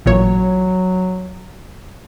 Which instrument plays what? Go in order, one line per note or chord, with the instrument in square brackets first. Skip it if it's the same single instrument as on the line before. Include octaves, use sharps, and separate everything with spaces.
[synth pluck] A1 A#2 C#5 [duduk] F#3